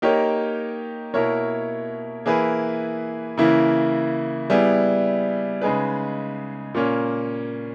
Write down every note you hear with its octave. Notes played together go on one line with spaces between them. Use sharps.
A#3 D#4 G4 A#4 C#5
B2 A#3 E4 A#4 C#5
E3 A#3 E4 G#4 B4
C#3 E3 A#3 E4
G3 B3 E4 G#4
C#3 G#3 D#4 G#4 B4
A#2 A#3 C#4